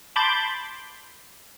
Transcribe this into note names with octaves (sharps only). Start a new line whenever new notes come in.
A5 B5 C6 D6 G6 A6